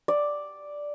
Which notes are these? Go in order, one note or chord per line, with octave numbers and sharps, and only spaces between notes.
D5